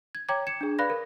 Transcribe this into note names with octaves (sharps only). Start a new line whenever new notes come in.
G#6
C#5 G5 A#5 D6 G#6
G#6 C#7 E7
D4 G#4
B4 D5 F5 B5 F#6 A#6
A#4